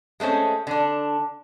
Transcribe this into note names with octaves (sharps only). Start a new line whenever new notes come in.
G#3 A3 C4 C#4
D3 D4